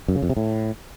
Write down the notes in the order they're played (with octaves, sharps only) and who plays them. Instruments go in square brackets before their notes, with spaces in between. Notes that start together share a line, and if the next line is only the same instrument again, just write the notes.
[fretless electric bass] F#2
C#3
F2
C3
A2